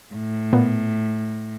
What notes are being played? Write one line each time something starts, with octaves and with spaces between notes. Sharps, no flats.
A2
A#2 B3